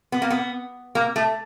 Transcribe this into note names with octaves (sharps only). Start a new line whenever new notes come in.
B3
A#3
B3
A#3
A3